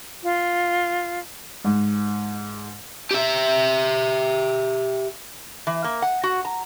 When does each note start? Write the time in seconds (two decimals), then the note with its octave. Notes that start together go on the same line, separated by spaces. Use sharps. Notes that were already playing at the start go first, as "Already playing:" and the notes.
0.23 F4
1.65 G#2
3.11 G4 E5
5.67 E3
5.84 A#3
6.02 F#5
6.23 F#4
6.45 A#5